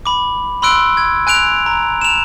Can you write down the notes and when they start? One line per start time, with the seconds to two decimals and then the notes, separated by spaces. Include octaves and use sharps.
0.06 B5 D6
0.62 B5 C6 E6 F#6 D7
0.97 G#6
1.27 G#5 F#6 D7 F7
1.66 A#5
2.01 E7 F7